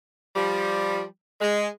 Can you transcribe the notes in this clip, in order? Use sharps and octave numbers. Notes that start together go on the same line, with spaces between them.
F3 G3
G#3